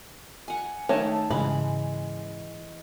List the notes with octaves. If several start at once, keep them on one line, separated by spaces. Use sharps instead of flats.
F#5 G#5
D#3 A3 C#5 A5
G#2 C#3 E3 G#3 B5